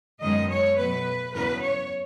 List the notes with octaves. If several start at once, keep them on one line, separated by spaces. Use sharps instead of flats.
F#2 D#3 G#3 B3 D#5
C#5
B2 F#3 A3 B4
E2 C#3 F#3 B3 B4
C#5